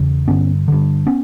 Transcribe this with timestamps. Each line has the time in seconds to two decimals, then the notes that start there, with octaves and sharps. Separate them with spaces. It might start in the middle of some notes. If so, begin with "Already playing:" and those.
Already playing: E2 C#3
0.28 G2 D3 B3 C#4
0.68 G2 D3
1.07 B3 C#4